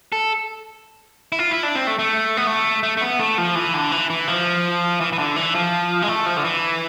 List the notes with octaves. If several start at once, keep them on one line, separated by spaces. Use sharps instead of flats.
A4
E4
F4
E4
D4
C4
A3
A3
B3
A3
A3
A3
B3
A3
F3
E3
D3
E3
E3
F3
E3
E3
D3
E3
F3
G#3
A3
F3
D3
E3